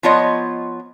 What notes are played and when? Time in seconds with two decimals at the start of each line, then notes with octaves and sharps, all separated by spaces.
0.03 F3 B3 F4 C#5 D#5